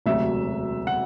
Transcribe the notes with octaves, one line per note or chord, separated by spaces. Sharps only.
E1 D2 C3 F#3 E5
F#5